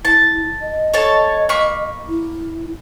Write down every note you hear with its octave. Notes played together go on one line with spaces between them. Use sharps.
E4 A5
D#5
A4 C#5 A5
A#3 B5 C#6
E4